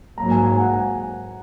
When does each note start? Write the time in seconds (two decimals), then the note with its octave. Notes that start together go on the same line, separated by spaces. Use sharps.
0.18 G#2 F#3 A#3 A#5
0.31 G#5
0.45 G#5
0.59 F#5
0.73 G#5